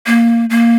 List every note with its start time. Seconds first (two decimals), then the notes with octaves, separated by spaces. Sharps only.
0.06 A#3
0.50 A#3